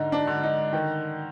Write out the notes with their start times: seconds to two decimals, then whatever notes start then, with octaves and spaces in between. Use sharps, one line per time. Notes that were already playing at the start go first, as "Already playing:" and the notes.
Already playing: G#2 D3 D#4
0.12 D4
0.27 D3
0.43 D#4
0.73 D#3